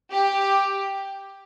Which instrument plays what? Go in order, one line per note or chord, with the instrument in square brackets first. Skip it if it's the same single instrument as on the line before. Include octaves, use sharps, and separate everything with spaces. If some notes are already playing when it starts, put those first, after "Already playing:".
[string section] G4